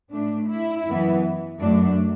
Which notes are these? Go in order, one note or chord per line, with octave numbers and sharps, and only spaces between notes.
A2 A3 D4
E4
F#2 E3 B3
F#2 F#3 A3 D4